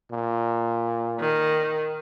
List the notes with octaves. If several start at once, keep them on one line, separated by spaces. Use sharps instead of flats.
A#2
D#3